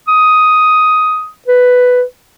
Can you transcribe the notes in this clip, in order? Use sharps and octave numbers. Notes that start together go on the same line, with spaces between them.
D#6
B4